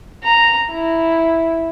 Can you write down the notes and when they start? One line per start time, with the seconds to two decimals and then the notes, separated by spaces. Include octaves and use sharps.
0.23 A#5
0.70 E4